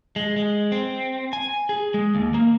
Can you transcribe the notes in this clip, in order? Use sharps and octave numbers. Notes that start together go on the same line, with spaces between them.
G#3
G#3
C4
G#5
G#4
G#3
D#2
A#3